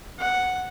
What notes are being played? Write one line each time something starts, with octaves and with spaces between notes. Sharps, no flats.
F#5